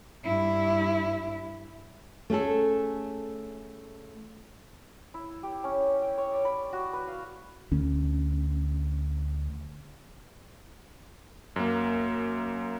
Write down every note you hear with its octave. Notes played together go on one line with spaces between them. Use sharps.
G2 E4
A3 C#4 G#4 A4
E4
G4
C#4
G5
C#5
D5
B5
F#4
B4
F5
D2 C#4
F#2 A#3